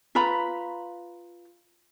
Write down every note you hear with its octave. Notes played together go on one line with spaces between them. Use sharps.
F4 B4 A#5 B5